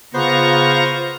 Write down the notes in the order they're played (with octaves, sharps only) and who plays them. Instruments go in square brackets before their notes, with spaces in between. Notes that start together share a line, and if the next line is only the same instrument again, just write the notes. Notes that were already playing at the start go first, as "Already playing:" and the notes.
[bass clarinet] C#3 [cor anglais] B3 [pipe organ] F4 A#5 C#6 [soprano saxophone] C5